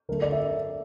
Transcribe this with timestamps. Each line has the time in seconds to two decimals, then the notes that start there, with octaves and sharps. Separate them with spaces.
0.09 D3 A3 A#4
0.22 D5
0.32 E5